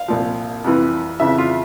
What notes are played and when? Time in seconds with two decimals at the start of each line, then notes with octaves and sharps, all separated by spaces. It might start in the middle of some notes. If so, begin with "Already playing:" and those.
Already playing: F5
0.08 C2 A#2 F3
0.64 F2 C3 E3
1.20 F2 C#3 E3 E5
1.38 F4